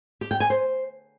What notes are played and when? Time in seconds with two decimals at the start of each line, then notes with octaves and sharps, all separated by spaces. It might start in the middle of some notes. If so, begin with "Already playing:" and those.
0.21 G4
0.31 G5
0.40 G#5
0.50 C5